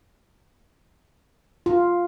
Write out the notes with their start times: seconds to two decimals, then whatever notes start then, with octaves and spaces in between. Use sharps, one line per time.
1.66 F4